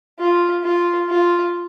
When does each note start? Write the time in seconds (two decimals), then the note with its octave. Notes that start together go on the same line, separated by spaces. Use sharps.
0.19 F4
0.64 F4
1.09 F4